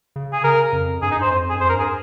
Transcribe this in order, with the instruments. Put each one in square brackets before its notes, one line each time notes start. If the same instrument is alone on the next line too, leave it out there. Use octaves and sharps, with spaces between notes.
[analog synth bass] C#3
[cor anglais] G#4
[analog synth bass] C#3 [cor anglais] A#4
[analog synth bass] F2
[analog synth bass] G2 [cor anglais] G#4
[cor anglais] D#4
[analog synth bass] G2 [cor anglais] C5
[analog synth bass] F2 [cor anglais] C5
[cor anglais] G#4
[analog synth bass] G2
[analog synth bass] F2 [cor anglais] C5
[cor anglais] A#4
[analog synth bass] G2
[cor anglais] G#4